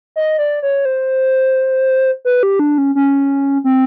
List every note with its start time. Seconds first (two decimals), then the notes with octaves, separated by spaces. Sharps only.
0.16 D#5
0.38 D5
0.62 C#5
0.85 C5
2.25 B4
2.43 G4
2.59 D4
2.78 C#4
2.95 C#4
3.64 C4